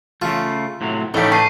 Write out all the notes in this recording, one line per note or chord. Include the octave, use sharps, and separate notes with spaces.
C#3 A3 F4
A2 C3 F#3
A2 C#3 E3 A3 D#4 G4
A5 C#6 C7 D#7